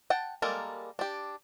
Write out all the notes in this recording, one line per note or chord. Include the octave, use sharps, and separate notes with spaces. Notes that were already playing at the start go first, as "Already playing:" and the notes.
F#5 G5 A5
G3 G#3 A#3 A4 A#4
D4 G4